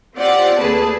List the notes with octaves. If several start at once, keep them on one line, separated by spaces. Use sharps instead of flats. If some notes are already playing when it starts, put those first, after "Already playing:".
C4 F4 G4 D5 F#5
D#2 A3 G#4 B4 A5